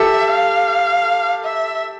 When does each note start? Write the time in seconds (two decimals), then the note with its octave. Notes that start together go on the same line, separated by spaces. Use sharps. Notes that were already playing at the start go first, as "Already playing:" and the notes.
Already playing: G4 A4 E5
0.31 F5
1.44 E5